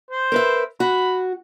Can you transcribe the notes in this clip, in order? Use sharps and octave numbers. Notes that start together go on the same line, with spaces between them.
C5
A#4 B4 E5
F#4 B5